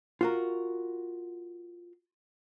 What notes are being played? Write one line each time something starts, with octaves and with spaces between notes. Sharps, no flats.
F4 F#4 A#4